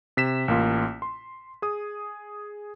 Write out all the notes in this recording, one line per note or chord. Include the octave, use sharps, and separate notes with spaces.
C3 B6 E7
A1 A#3 F4
C6
G#4 D#6